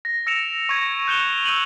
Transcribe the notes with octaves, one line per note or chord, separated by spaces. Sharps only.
A#6
E6 A#6 C#7 D7 E7 F7
C#6 G#6 A#6 D#7
F#6 G6 C#7 E7 F7 G7
E6 G6 D#7 F#7